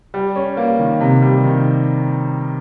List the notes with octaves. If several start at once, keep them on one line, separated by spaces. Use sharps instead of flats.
G3
C#4
A#3
D#3
C3
G3
D#3